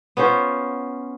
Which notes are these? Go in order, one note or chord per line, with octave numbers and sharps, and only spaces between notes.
B3 C#4 F4 C5